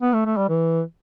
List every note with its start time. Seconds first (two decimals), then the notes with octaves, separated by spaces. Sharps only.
0.02 B3
0.13 A3
0.26 A3
0.37 G3
0.49 E3